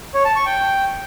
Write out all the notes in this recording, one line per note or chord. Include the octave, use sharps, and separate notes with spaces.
C#5
A5
C#6
G5